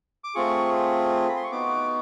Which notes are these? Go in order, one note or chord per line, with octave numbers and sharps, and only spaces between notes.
D6
A3 C4 F4 G#4 C#6
B5
C6
C#6
B3 D#4 F#4 D6